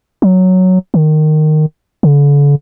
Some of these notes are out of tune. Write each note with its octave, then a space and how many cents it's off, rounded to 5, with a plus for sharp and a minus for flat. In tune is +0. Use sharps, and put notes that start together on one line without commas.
F#3 +0
D#3 -15
D3 -40